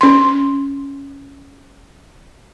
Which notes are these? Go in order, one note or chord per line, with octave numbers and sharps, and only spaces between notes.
C#4 C6